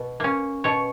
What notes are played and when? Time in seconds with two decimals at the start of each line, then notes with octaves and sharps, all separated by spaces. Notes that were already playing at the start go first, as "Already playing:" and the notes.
Already playing: B2
0.20 A#3 C#4
0.64 B2 C#5